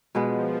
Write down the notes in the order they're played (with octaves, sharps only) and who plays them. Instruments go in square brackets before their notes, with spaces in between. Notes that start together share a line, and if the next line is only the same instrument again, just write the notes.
[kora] B2 G#3 B3 [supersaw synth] F3